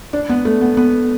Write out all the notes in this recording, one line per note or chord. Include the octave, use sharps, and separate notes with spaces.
D4
B3
A3
B3
B3